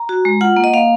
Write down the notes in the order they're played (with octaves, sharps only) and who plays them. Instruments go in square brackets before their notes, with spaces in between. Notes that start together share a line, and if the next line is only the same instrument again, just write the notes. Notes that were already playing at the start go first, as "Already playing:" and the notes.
Already playing: [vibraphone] A#5
F#4
G#3
F4 F#5
A#3
D#5
A#3 F5